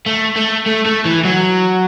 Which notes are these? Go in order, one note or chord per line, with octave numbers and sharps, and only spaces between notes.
A3
A3
A3
A3
E3
F#3